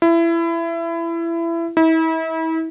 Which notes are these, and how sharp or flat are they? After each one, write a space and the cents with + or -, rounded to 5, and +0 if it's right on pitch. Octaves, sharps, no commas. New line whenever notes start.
E4 +25
E4 -35